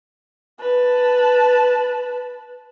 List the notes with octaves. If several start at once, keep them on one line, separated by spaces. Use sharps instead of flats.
B4 A5